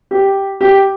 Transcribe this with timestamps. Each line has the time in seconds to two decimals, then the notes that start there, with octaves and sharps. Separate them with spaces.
0.11 G4
0.61 G4